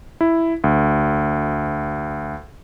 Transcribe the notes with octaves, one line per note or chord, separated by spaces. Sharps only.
E4
D2